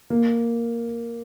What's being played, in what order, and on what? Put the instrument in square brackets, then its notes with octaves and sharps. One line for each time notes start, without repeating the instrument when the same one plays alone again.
[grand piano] A#3